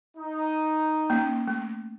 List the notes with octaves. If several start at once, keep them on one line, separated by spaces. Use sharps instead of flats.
D#4
A#3 C#4
A3